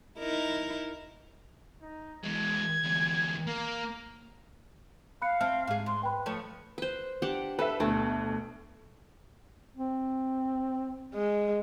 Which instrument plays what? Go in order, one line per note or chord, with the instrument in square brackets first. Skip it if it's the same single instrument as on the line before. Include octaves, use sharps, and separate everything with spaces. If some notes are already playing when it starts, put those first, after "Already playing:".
[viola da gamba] D#4 E4 A#4
[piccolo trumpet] D#4
[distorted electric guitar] E3 G#3 [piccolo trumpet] G#6
[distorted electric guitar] E2 D3
[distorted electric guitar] A#3 [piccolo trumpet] A#4
[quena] F5 [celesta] B5 F#6 C#7
[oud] C4 [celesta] E5 A5 F6
[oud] G#2 G#4
[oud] G#2 [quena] C6
[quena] B4 [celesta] G5 B5
[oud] F3 A3 C#5
[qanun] B4 C5
D4 G4 F#5
[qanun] A4 [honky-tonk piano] B4 E5
[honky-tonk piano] D2 B2 [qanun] A3
[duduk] C4
[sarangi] G#3